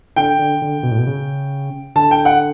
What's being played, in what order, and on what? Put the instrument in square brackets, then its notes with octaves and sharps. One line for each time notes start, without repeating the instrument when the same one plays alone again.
[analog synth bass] D3 [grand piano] G5
[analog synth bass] D3
D3
B2
A2
B2
C#3
[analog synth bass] D3 [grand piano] A5
[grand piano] G5
F#5